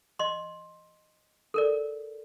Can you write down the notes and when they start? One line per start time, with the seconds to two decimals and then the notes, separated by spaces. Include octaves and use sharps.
0.19 D#5 C6
1.54 A4 A#4 D5